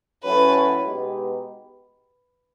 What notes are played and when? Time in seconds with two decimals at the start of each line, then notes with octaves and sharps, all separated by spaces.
0.23 A2 F#3 A3 C#4 B4
0.84 B2 G#3 B3 D#4 G4